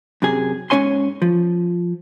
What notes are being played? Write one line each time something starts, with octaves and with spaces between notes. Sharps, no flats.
F#2 C3 G#4
G#2 C4 C#4 C#5 G#5 C6
F3